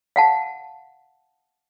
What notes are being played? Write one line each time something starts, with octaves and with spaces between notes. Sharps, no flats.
F5 F#5 A5